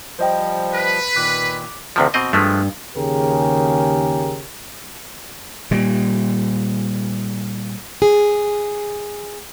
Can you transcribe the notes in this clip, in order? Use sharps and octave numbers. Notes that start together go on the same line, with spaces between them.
F3 G3 C5 D#5 G5
B4
A#2 D#3 D6 F#6 B6
D2 C3 F3
B2 C4 D#5
G2 F3 G#3 A3
D#2 C#3 G4 G#4 A#4
A#2 G3
G#4